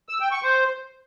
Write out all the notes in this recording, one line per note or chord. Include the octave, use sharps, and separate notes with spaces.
E6
G5
C#6
C5